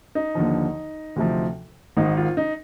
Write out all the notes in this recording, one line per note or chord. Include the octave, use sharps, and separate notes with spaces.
D#4
D#2 D3 F3
D2 C3 F3
G#1 G#2 D#3 D#4
F4
D#4